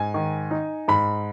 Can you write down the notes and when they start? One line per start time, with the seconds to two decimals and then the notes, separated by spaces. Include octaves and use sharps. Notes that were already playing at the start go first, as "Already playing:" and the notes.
Already playing: G#2 G#5
0.14 D#3
0.51 D#4
0.88 G#2 B5